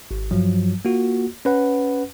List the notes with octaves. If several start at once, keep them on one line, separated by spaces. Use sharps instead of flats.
G#1
G2 F3 F#3
A#3 F4 F#4
C#4 B4 F#5